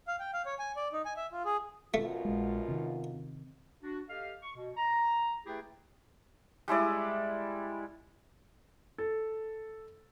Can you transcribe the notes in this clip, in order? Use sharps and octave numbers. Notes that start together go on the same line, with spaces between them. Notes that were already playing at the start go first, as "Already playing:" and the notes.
F5
G5
F5
C#5
G#5
D5
D#4
G#5
E5
F4
G#4
F#2 B2 A3 F4
A#1 G#3
C3 D#3
D4 F#4
G4 A4 D#5 F5
C#6
B2
A#5
A3 E4 G4 G#4 B4 G5
G3 G#3 E4 D5
A4